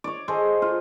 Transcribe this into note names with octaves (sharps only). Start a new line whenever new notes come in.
C#5 D5
G#4 A4 C5 D#5
F4